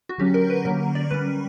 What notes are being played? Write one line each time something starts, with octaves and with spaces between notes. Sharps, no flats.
F#4
D3 F#3 C#4 G4
A#4
B4
D3 F#3 A#3 C#4 A#4
D5
G3 C#4 B4